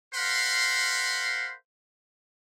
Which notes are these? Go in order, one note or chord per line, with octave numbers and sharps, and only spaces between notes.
A#4 C5 F5 F#5 B5 C6